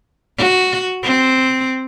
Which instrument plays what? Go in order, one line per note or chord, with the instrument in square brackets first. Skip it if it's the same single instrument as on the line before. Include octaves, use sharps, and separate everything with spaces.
[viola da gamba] F#4
C4